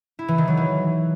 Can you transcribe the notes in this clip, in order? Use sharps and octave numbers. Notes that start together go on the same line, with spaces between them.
E4
E3
D#3
F#3
E3